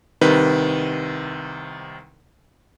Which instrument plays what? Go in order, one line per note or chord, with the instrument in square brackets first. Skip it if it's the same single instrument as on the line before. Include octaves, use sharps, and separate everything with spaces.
[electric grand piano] C2 C3 D#3 B4